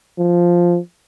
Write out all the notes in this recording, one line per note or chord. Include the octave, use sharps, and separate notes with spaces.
F3